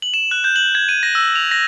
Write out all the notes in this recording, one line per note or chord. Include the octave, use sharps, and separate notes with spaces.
F#7
E7
F#6
G6
F#7
G#6
D#7
A#6
E6
F7
A#6